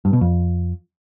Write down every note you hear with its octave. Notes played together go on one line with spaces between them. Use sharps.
G2
B2
F2